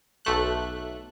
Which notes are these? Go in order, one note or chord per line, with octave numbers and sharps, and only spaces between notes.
B1 A3 F#6